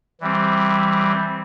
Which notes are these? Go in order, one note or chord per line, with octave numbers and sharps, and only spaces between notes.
E3 G3 C4